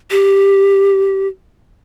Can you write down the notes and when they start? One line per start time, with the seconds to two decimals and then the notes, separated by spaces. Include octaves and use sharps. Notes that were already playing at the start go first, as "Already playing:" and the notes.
0.11 G4